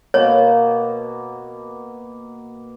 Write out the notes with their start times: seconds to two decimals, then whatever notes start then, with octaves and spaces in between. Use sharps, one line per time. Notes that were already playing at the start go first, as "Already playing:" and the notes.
0.14 B2 A#3 C#5